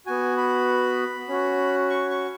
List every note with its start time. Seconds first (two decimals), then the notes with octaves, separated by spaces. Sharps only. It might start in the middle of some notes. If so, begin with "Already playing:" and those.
0.06 B3 F#4 G#5
0.37 B5
1.28 C#4 F#4
1.90 C#6
2.11 C#6